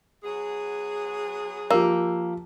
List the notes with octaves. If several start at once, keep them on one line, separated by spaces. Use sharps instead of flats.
F#3 B3 G#4
F3 A#3 G4 E6